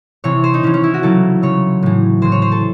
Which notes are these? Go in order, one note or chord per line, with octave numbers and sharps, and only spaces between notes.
C3 E3 C#5
C5
D#4
C3 E3 C#4
C#4
E4
F#4
C#3 F#3 A4
C#3 F#3 C#5
A2 E3
A2 E3 C5
C#5
C5
A4